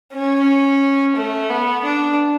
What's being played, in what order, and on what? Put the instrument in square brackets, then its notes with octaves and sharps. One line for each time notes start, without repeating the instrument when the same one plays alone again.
[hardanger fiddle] C#4
A3
B3
D4